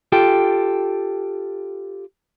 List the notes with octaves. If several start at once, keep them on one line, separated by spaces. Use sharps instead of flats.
F4 G4 A4 G5